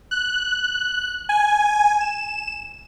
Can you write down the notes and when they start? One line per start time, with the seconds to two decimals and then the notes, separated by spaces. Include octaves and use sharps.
0.11 F#6
1.29 G#5
2.00 E7